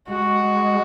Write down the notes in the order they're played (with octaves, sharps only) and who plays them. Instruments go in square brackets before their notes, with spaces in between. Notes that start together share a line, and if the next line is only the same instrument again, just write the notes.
[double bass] G#3 [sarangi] F#4